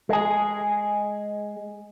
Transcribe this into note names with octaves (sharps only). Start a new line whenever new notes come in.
G#3 G#4